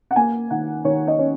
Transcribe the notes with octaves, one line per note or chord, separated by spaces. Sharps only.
F#5
A#3 G#5
D#3 F#5
D#3 C#5
D#5
C#4